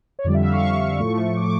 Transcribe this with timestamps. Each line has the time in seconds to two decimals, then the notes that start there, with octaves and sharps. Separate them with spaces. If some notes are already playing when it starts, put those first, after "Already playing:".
0.19 C#5
0.24 F2 D3 G3 D5
0.34 E5
0.43 F5
0.53 C#6
1.00 A2 F3 A3
1.37 D6